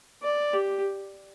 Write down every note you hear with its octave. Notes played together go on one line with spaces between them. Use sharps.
D5
G4